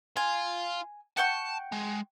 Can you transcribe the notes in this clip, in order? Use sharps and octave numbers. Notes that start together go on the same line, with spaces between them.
F4 G#5
F#5 G5 A5 C#6
G#3